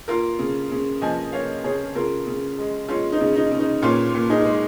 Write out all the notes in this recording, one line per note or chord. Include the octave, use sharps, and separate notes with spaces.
A#3 F4 A#4
C#3
C#3
F3 D#5 G#5
A#3 C#5 F5
C#3 G#4 C#5
C#3 F4 A#4
C#3
G#3
G#3 C#4 F4
D#4
C#3
D#4
C#3
D#4
A#2 C#4 F4
A#2
D#4 G#4
G#3